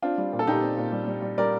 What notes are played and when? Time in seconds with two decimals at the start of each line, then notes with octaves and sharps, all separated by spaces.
0.02 C4 D4 F4
0.18 G3
0.33 A#2
0.39 A4
0.47 A#2 D#4 G4
0.62 C4
0.77 A#2
0.92 G3
1.07 G3
1.22 G3
1.38 G3 A#4 D5